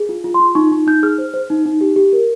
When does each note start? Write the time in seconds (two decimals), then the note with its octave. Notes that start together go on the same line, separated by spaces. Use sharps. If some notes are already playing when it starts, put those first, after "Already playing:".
Already playing: G#4
0.09 F4
0.24 F4
0.34 C6
0.40 F4
0.55 D#4 C#6
0.72 D#4
0.87 D#4 G6
1.03 G#4 F6
1.18 C5
1.34 C5
1.50 D#4
1.65 D#4
1.81 G4
1.96 G4
2.13 A#4